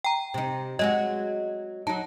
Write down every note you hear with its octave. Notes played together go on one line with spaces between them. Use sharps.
G5 A#5
C3 D#4
F#3 G#3 F#4 D#5
F#3 D#4 A5